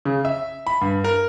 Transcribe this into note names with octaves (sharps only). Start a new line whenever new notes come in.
C#3
E5
B5
G2
A#4